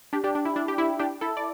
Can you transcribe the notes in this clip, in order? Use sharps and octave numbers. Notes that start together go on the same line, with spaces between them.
D4 G4
D4 G4
D4
E4
D4
G4
E4
D4 G4
E4 A4
D5